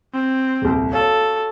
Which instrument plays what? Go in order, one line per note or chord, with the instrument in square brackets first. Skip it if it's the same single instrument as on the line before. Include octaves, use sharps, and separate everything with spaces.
[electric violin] C4
[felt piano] D#1 C2
[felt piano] F#4 C#5 F5 [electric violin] A4